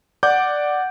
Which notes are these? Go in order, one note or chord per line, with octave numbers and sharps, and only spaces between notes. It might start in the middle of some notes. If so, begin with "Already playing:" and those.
D5 F#5 D6 G6